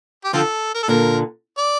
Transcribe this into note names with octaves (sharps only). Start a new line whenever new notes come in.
G4
D3 F3 C4 F4 A4
A#4
A4
A#2 D3 A#4
D5